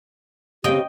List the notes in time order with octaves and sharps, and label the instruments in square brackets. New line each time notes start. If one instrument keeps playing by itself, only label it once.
[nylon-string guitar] C#3 C4 [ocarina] G4 [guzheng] D#5 G5